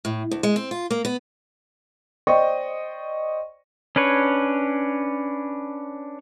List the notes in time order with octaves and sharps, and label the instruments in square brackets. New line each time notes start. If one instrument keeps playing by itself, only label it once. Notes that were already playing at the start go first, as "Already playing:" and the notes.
[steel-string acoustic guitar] A2
D2
G#3
C4
F4
A#3
B3
[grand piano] C5 D5 D#5 G5 C#6
[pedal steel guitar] C#4 D4 B4 C#5